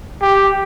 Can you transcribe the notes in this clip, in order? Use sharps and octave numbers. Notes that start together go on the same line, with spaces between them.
G4